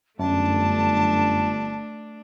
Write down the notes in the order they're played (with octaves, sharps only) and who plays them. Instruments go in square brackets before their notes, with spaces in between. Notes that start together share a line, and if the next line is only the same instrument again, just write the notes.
[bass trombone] G1 [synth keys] F#2 [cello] A3 D4 [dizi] A5